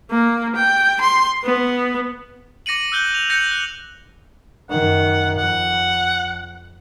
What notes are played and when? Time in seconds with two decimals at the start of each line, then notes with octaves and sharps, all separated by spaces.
0.11 A#3
0.55 G5
1.00 C6
1.44 B3
2.66 D6 A#6 C#7 D#7 F#7
2.92 E6 F#6 G6 G7
3.14 F7
3.30 G6 A#6 C#7 F#7
3.51 F#6
4.70 F#2 D#3 F#5
5.37 F2 F#5